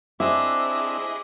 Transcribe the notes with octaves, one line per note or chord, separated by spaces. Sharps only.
C4 D4 E4 G#4 D#5 E5 D6 E6